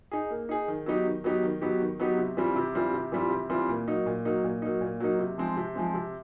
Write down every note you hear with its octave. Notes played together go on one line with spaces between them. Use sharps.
D#4 G#4
A#3
D#4 G#4
D#3
F#3 B3 D#4 G4
D#3
F#3 B3 D#4 G4
D#3
F#3 B3 D#4 G4
D#3
F#3 B3 D#4 G4
C3
E3 G3 C4 F4
C3
E3 G3 C4 F4
C3
E3 G3 C4 F4
C3
E3 G3 C4 F4
A#2
F#3 A#3 D#4
A#2
F#3 A#3 D#4
A#2
F#3 A#3 D#4
A#2
F#3 A#3 D#4
C3
F3 G#3 C4
C3
F3 G#3 C4
C3